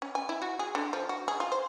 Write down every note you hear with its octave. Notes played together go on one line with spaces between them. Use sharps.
C#4
G#5
E4
F#4
G#4
D3
F3
F#4
G#4
F4
C5